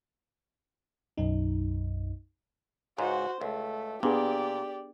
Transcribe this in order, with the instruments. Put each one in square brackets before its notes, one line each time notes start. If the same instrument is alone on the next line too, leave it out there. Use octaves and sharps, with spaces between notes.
[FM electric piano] B1 F#2 D#4
[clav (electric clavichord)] C#2 G#2 [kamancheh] F#4 C5
[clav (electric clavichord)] C#2 [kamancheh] A3
[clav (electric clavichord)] A#2 [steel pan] B3 D4 G#4 [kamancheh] G4 D5